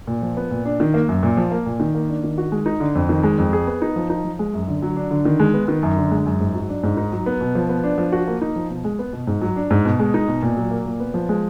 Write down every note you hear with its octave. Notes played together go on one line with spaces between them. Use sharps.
A#2
F3
B3
A#2
D4
D#3
A#3
F#2
A#2
F3
A#3
A#2
D#3
A#3
D4
D#3
F#4
G#3
D#4
D3
F2
D#3
G#3
F2
G#4
B3
D#4
F3
D#4
F3
G#3
F#2
D3
F#3
D4
D3
D#3
G#3
B3
D#3
F#2
D3
G#3
F#2
G#2
F#3
D4
G#2
D#4
F#3
B3
B2
F3
B3
D4
F3
F#4
A#3
D#4
F3
B2
G#3
B3
B2
G#2
F#3
D4
G#2
B2
G#3
D#4
B2
A#2
F#3
A#3
A#2
B3
F3
G#3